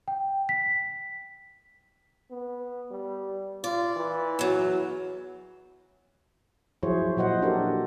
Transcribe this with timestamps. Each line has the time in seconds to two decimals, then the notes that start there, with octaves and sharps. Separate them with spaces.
0.08 G5
0.49 B6
2.31 B3
2.91 G3
3.64 F4 D5
3.96 E3
4.39 E2 F#3
6.83 F3 F#3 E4 G#4 C5 C#5
7.17 A#2 F#3 F#4 C5 D#5 F#5
7.42 D4 F#4 G4 A4 A#4